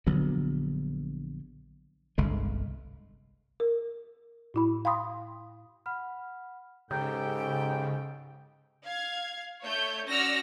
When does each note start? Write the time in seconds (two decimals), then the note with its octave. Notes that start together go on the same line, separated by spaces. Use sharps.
0.07 A#1 D3 F#3 B3
2.18 G1 C2 D3 G#3
3.60 A#4
4.54 A2 E4 B5
4.85 F5 G5 B5 C6 D#6
5.86 F#5 B5 F6
6.91 G#2 C#3 G4 A4 G5 A#5 G6
8.84 F5 G#6
9.64 A3 C#5 E5 G6
10.09 C#4 F#4 D5 E6 F6 A#6